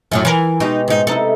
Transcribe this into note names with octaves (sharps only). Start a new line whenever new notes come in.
F#2 A2 F#3 F4
E3 A#4
B2 G#3 D#4 G4
G#2 D#4
C3 D#4 E4 A4